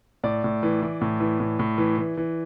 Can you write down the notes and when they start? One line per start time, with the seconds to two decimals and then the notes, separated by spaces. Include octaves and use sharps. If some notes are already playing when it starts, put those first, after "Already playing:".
0.24 A2 D5
0.44 A2
0.63 E3
0.82 E3
1.01 A2
1.20 E3
1.40 A2
1.59 A2
1.78 E3
1.98 E3
2.17 E3